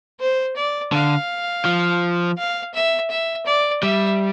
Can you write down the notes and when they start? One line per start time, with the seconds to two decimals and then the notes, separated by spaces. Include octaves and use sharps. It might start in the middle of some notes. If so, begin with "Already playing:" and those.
0.20 C5
0.56 D5
0.92 D3 F5
1.65 F3
2.38 F5
2.74 E5
3.10 E5
3.46 D5
3.83 G3 E5